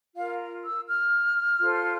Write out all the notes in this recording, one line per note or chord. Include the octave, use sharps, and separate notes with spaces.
F4 A#4 F5
E6
F6
F4 A4 C5